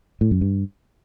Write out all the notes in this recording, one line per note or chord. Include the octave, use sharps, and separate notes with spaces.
A2
F#2
G2